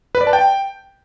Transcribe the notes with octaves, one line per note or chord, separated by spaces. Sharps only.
B4
D5
A5
G5